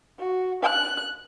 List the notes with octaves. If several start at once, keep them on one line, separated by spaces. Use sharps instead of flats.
F#4
F#6